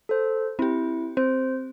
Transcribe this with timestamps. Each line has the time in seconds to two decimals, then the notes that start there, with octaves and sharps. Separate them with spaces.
0.09 A4 C5
0.59 C4 E4 G4
1.17 C4 C5